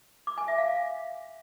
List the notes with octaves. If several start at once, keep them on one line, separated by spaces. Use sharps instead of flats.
D6
G#5
E5
F5